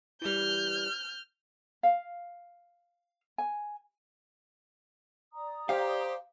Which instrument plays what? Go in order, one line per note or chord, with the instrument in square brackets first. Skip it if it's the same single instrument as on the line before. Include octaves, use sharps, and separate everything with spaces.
[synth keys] E3 G3 [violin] F6 G6
[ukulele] F5
G#5
[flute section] D5 A#5 D#6
[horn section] G4 [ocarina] C5 [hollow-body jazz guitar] F5